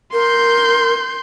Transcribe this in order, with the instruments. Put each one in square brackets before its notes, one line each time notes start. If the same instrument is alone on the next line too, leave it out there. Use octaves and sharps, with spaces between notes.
[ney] A#4 [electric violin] C6 G6